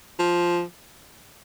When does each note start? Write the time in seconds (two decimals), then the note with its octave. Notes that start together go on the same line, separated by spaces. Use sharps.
0.19 F3